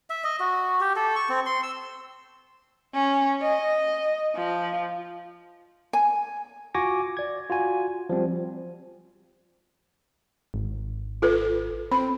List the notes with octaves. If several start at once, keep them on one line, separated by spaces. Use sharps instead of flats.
E5
D#5
F#4
G4
A4
C#6
C4
C6
E6
C#4
D#5
F3
G#5
F4 F#4 G#5 C#6 D6 A#6
D5 G#6
F4 F#4 G#5
F3 G3 C4
G#1
F4 A4 B4
C4 B5